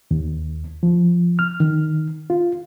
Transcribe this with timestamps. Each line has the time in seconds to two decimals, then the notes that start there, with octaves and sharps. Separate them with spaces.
0.11 D#2
0.83 F3
1.39 F6
1.60 D#3
2.30 F4